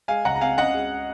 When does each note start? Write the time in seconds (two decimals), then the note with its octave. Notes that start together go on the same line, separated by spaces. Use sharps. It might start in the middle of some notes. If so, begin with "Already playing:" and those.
0.08 G#3 F5 G#5
0.25 C#2 F#5 A#5
0.36 A#5
0.41 C4 F5 G#5
0.58 C#3 D#5 F#5
0.74 G#3